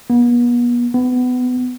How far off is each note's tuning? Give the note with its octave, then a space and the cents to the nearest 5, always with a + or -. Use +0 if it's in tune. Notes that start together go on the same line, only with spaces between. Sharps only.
B3 -40
B3 +20